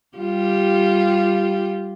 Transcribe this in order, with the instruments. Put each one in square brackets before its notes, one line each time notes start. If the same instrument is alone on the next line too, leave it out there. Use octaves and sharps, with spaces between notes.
[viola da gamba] G3 F4 G4